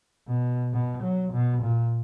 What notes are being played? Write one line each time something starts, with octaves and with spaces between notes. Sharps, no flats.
B2
B2
F#3
B2
A#2